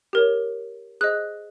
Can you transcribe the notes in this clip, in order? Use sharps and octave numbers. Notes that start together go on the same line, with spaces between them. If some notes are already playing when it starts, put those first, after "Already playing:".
G4 A#4 C#5
G#4 C5 D#5 F#6